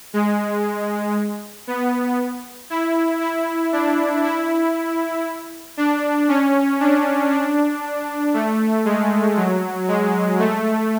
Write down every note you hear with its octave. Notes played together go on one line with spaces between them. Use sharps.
G#3
B3
E4
E4
D4
E4
D4
C#4
D4
D4
A3
G#3
F#3
G#3
A3